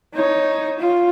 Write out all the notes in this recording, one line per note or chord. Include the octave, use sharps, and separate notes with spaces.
D#4 C#5
F4